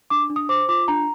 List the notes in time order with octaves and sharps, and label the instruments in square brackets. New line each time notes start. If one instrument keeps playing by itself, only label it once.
[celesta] D4 D6
D4
D#6
C5 D6
F4 D6
D4 A#5